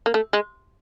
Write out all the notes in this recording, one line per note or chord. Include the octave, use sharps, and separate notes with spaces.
A#3
A3
G#3